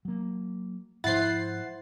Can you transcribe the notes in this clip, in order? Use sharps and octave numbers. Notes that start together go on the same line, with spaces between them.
F#3 A#3
G#2 F3 E4 C5 F#5 A6 C7